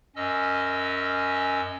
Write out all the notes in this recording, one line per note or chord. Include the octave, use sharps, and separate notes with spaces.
F#2 C#4 D#5 E6